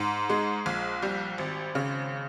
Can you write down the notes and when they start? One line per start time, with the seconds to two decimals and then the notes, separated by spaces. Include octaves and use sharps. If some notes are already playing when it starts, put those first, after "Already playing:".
Already playing: G#2
0.30 G#3
0.66 A#1
1.02 G3
1.38 G#1
1.75 C#3